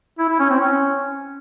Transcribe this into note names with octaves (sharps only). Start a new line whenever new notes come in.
E4
E4
C#4
C4
C#4